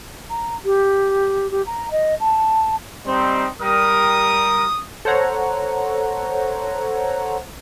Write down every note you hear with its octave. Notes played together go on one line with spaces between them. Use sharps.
A#5
G4
G4
A#5
D#5
A5
G3 C4 D#4
G3 A#4 D#6
A4 C5 C#5 F#5 A#5